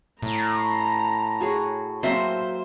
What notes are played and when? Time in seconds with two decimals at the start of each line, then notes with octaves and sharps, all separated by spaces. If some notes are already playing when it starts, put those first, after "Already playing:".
0.22 A2 A#5
1.41 F#4 G#4 C#5
2.03 F#3 A#3 C4 C5 E5 C6